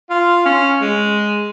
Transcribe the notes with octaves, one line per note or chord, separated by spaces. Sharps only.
F4
C#4
G#3